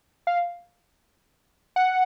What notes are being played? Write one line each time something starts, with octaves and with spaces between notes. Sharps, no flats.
F5
F#5